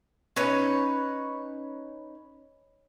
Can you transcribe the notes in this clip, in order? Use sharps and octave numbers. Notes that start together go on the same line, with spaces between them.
C#4 D#4 B4 C#5